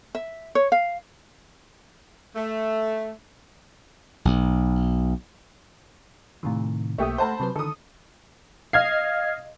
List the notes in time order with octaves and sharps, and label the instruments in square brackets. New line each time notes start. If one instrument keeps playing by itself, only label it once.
[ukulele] E5
C#5
F5
[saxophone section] A3
[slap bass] B1
[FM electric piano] A2 C3 D#3
[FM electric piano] B1 A#3 D#6 [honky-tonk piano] A3 G4
[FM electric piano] A3 F#5 [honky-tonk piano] C5 A5 B5
[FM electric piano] C3 F#3 B4
[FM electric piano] D3 D#3 [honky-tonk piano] A4 D#6
[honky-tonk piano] D#5 F5 [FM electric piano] F6 G#6 C7